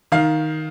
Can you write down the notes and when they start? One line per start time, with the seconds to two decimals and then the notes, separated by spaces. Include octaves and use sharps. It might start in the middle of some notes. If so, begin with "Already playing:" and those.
0.12 D#3 F5